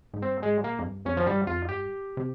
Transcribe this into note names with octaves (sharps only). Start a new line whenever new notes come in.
G#2
G2 C4
G#2 G#3
A#2 A#3
F2
G2
F2 C#4
F3
G2 G3
F2 F4
G2 G4
C3